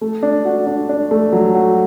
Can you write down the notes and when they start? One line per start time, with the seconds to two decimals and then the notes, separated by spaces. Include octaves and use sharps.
0.01 A3
0.23 D4
0.45 F#4
0.67 D4
0.89 D4
1.11 A3
1.32 F#3
1.55 F#4